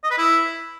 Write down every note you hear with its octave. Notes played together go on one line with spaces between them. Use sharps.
D#5
B4
E4